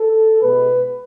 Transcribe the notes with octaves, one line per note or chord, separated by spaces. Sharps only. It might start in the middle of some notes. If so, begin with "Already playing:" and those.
Already playing: A4
B2 G#3 B3 B4